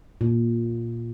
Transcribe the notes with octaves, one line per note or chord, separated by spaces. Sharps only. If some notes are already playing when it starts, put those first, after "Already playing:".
A#2